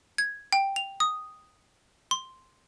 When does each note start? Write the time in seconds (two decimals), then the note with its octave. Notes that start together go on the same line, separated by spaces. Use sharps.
0.18 G#6
0.53 G5
0.76 F7
1.00 D#6
2.11 C6